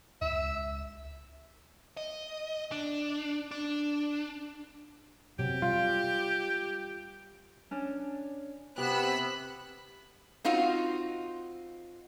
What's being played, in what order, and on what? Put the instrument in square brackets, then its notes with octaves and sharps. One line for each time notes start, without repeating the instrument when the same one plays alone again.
[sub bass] C#2 [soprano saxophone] E5
[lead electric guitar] D#5
D4
D4
[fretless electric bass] C3 F#3 [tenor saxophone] G4
[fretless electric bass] G3 [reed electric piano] F4
[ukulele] C#4 D4
[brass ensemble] C3 B3 [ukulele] G4 [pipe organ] B5 [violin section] E6 F#6
[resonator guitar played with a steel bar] C4 D#4 F4 F#4